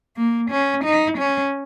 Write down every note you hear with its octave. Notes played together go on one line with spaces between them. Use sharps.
A#3
C#4
D#4
C#4